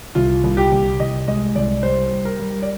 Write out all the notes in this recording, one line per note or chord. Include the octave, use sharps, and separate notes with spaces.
C2 F4
C2
G4
C2
C2 D#5
G#3 D#5
C2 D5
G3 C5
G3
A#4
G3
D5